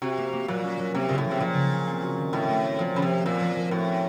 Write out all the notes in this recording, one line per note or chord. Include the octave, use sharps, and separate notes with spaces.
C3 F#4
A#3
A#3
A#2 F#3
C#4
F#3
C3 A#3
A#2 C#3
A2
F3
C3
A#2 C#3
C#3
C#4
C4
F#4
D#3
A2 A3
A3
C4
A#2 F3
C#3 C4
C3
C4
A#2 C4
F3
F3
A2 F#4
C#4